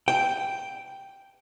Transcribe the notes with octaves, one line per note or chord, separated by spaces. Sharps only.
G5